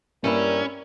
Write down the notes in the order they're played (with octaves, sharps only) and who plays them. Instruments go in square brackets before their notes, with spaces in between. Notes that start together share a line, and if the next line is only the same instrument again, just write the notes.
[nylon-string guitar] G2 A#3 D4 [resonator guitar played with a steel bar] G3 E4 [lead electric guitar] C#4 [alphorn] A#4